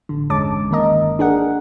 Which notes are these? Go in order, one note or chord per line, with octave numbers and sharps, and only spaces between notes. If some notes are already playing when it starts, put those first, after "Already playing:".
A1 D3
G1 E2 G#3 C#4 A5 D6
D#3 A#3 A#4 D#5
G1
D4 G#4 A#4 F#5